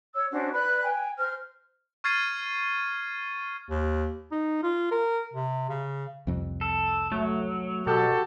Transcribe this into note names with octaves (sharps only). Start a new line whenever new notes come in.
C#5 E6
C#4 D4 F#4 C5
B4 D5 B5 F#6
G5 G#5
C5 F6
C#6 F6 G#6 A6 C7 D#7
D#2
D#4
F4
A#4
C3
C#3
C2 F2
A4
F#3 A3
B2 F#4 G4 A4